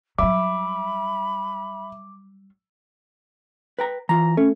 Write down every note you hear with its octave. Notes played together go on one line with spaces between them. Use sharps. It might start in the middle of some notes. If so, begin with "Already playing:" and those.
F#3 G3 E5 B5 D6
B4 G5 A#5
E3 F4 A#5
A3 C#4